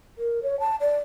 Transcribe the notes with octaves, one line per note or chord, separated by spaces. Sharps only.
A#4
C#5
A5
D5